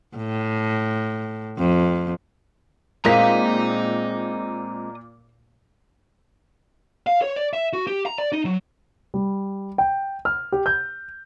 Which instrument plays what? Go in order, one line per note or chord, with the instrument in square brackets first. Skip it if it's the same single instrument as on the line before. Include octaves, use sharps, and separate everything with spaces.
[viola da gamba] A2
F2
[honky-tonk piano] A#2 B6 [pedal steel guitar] G#3 C4 [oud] A#3 [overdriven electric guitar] D#5 A#5
[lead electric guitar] F5
C#5
D5
E5
F#4
G4
A#5
D5
D#4
F#3
[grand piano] G3
G5
F6
G4
G6